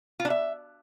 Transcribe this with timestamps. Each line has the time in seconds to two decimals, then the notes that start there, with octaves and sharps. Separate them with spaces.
0.20 F4
0.25 D4
0.30 E5